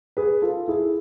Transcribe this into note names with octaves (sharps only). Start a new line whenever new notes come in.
G#4 B4
F4 A4
E4 G#4